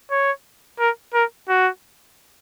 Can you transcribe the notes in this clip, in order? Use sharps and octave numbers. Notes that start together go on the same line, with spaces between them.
C#5
A#4
A#4
F#4